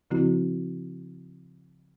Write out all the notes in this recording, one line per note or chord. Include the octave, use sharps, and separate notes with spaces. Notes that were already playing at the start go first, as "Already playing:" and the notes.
C#3 F3 C4 E4 F#4